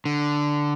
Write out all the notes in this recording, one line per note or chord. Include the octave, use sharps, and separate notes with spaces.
D3